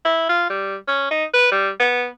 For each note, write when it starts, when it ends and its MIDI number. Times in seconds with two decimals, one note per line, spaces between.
0.05 0.27 64
0.29 0.45 65
0.50 0.76 55
0.88 1.09 61
1.11 1.25 63
1.34 1.50 71
1.52 1.69 55
1.80 2.07 59